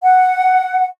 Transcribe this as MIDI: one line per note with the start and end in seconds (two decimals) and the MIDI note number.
0.03 0.86 78